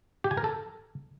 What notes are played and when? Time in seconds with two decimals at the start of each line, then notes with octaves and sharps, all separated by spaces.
0.24 G4
0.31 G#5
0.37 A#4
0.44 A4